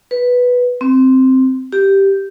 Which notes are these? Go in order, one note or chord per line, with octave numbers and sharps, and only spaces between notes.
B4
C4
G4